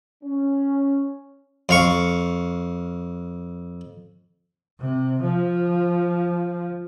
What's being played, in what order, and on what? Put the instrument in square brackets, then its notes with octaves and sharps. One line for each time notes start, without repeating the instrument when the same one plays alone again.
[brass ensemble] C#4
[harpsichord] F2 F5 C#6
[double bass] C3
F3